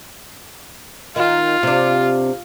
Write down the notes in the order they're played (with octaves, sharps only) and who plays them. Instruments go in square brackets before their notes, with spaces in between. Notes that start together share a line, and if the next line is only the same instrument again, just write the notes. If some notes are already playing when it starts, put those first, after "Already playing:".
[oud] D#3 [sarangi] F4
[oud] C3 D4